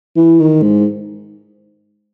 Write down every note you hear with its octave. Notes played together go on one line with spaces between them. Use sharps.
E3
D#3
G#2